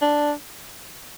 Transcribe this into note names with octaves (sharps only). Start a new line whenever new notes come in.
D4